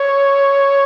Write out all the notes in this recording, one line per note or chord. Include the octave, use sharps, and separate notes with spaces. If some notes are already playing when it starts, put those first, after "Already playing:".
Already playing: C#5